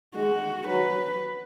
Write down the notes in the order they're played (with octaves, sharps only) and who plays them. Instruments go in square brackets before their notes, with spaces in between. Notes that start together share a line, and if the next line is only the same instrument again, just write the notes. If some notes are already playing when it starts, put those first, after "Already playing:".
[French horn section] G#3 [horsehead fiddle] F#4
[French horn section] F#3 [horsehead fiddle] B4